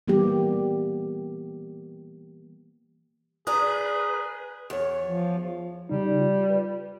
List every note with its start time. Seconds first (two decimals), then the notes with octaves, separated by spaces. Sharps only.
0.08 E3 G3 A#3 B3 G4
3.47 G#4 B4 D5 G#5 A#5 D#6
4.70 E2 C#5
5.05 F3
5.89 C#3 G3 D#4
6.20 F4
6.50 B4